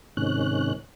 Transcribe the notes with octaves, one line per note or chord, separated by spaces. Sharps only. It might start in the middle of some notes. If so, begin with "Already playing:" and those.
G#2 C3 D#3 C#4 F#6